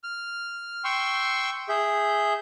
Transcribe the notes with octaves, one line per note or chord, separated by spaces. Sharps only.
F6
G5 C6 C#6 E6
G#4 E5 G6